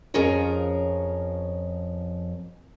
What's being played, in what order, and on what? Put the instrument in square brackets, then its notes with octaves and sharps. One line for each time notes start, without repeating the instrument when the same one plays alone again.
[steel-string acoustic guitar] F2 F3 C#4 G#4 A#4 C#5